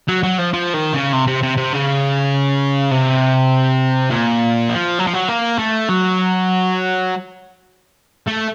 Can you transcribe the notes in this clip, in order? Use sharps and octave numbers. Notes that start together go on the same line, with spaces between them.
F#3
F#3
F3
F3
D#3
C#3
C3
C3
C3
C3
C#3
C3
A#2
F3
F#3
F3
F#3
A#3
A3
F#3
A3